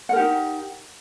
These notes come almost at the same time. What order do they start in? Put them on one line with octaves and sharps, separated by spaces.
F#5 A#4 G4 D#4